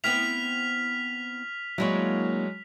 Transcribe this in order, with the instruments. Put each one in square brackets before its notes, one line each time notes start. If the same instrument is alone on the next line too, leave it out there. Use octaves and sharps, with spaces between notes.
[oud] B3 C4 E4 [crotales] F6 B6 F7
[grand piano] F#3 G#3 C#5 [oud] A#3 D4 E4